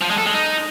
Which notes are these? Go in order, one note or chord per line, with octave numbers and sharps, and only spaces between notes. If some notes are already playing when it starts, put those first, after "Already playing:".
F3
G#3
A4
G#3
D#4